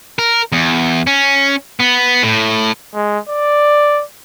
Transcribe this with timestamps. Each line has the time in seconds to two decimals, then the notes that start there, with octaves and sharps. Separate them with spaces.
0.19 A#4
0.52 E2
1.07 C#4
1.80 B3
2.23 A2
2.95 G#3
3.29 D5